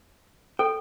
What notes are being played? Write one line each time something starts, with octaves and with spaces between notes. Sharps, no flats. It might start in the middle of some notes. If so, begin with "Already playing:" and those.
A4 G5